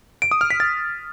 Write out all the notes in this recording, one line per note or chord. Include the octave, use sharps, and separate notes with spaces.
D7
D#6
F6
B6
A6